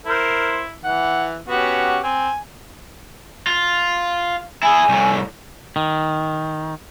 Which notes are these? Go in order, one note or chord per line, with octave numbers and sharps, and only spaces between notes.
E4 A#4 C5
E3 F#5
B3 C#4 F#4 G4
C4 G#5
F4
E4 G#4 G#5
C2 A2
D#3